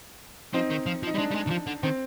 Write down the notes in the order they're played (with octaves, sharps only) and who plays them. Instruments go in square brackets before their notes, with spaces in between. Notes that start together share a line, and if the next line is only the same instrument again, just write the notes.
[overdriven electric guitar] F3 [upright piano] C4 D#4
[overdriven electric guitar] D#3
F3
F3
[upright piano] D#4
[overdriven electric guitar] G3
[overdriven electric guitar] G#3 [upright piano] D4
[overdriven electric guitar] G3
G#3
D#3
F3
D3
[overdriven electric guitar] D#3 [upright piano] C4